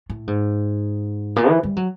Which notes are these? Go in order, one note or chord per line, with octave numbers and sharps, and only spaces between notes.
A2
G#2
A#2
E3
G3
F#3